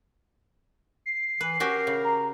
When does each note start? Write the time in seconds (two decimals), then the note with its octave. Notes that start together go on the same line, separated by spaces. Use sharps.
1.06 C7
1.41 E3 B4
1.60 C#4 F#4 G4 A#4
1.87 C#3
2.05 A#5